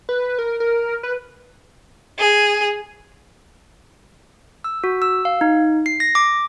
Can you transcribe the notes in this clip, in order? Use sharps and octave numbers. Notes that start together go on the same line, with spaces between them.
B4
A#4
A#4
B4
G#4
E6
F#4
E6
F5
D#4
C7
A#6
D6